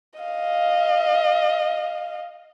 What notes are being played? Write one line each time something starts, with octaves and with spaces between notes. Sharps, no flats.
D#5 F5